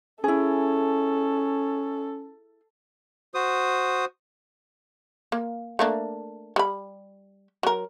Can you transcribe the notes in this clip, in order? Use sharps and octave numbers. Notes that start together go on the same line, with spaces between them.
C#4 E4 G#4 A4
F#4 C5 D#6
A#3
A3 A#3 D4
G3 B5
F#3 A#4